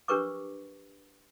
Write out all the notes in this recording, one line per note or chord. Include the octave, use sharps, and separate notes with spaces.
D4 G4 A#4 B4 C#6 D6